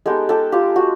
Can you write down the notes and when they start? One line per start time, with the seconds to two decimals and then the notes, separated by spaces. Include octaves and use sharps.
0.06 G#3 B3 D#4 G4 A4
0.29 G4 A4
0.52 F4 G4
0.76 F#4